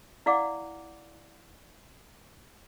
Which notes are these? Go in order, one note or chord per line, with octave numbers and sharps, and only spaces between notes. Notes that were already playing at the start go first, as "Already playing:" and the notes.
E4 D5 F5 F#5 D6